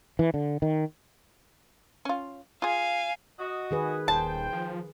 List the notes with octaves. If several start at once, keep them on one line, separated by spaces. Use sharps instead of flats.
E3
D3
D#3
C#4 F4
F4 G#4 F5 G#5
F#4 D#5
D#3 G#4 B4
D#1 C5 G5 A5
F3